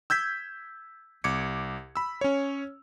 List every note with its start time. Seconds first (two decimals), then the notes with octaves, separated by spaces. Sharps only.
0.10 E6 G6 G#6 B6
1.24 C2 D6 G#6 C#7
1.96 B5 E6
2.21 C#4 C#5